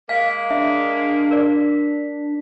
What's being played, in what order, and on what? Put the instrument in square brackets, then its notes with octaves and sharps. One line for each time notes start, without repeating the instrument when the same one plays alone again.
[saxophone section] G#3 A#3 [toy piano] F5 [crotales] B6
[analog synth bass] D4 [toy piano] E5
[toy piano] A#4 D5